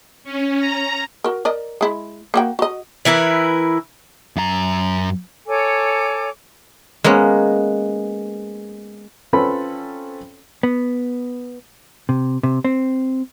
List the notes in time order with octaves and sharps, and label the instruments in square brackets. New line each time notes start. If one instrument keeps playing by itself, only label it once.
[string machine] C#4
A#5
[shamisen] F#4 A#4
A#4 D5 D#5
G#3 E4
A#3 F#4 G5
F#4 D#5
[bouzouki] E3 E4 A#4 B4
[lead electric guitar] F#2 A#5
[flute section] A4 C#5 G#5 D6
[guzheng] G#3 A#3 B3 C#4
[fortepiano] C4 C#4 F4 A4 B4 B5
[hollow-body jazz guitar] B3
C3
C3
C4